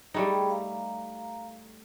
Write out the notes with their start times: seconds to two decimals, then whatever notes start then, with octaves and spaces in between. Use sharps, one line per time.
0.14 G3 A3 D#4 G#4 G5 B5
0.50 F5 A#5